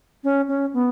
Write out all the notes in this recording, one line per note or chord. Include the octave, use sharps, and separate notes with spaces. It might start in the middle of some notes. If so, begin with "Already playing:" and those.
C#4
C#4
B3